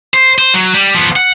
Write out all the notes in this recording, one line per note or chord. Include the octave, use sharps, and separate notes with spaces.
C5
C5
F#3
G3
F3 B3
F#5